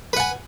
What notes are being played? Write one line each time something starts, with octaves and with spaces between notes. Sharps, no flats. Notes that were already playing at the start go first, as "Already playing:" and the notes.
B4 F#5 G#5